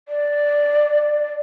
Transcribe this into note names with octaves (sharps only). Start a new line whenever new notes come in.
D5